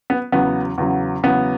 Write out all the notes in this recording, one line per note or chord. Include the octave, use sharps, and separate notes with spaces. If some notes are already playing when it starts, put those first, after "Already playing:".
B3
E2 C#3 F#3 B3
E2 C#3 F#3
E2 C#3 F#3 B3